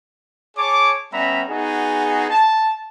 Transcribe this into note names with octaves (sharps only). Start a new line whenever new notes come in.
G#4 C#5 A5 D6
G3 B3 C#4 E5 A#5 B5
B3 D#4 F#4 G#4
A5